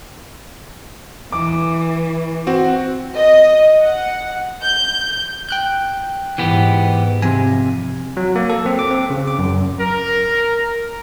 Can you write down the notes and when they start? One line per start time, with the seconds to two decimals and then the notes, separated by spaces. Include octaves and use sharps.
1.32 E3 D6
2.47 C4 F#4
3.16 D#5
3.81 F#5
4.62 G6
5.49 G5 F#6 G6
6.38 G#2 E3 B3 G4
7.22 F2 C3 G#5
8.17 F#3
8.36 A#3
8.50 A4
8.66 C4
8.79 D6
8.91 C4
9.10 C#3
9.27 D6
9.39 F#2
9.79 A#4